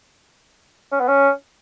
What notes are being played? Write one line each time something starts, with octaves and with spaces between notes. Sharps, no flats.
C#4
B3
C#4